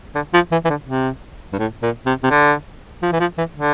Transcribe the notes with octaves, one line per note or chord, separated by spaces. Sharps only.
D3
F3
E3
E3
D3
C3
G2
A2
A#2
C3
C3
D3
F3
E3
F3
E3
D3